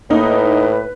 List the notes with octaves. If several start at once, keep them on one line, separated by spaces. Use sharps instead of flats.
A2 A#3 D#4 B4